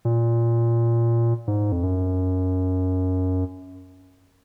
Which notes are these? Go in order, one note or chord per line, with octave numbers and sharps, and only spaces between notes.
A#2
G#2
F2
F#2